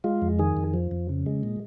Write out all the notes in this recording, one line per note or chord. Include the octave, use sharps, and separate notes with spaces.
G#3 F4
F2
D#3 G#4
F2
F3
F2
C#3
G#3
A#2